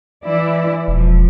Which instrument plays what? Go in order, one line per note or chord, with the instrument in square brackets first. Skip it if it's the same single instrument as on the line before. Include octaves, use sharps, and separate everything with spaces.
[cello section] E3 E4 D5
[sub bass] E1 [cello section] F3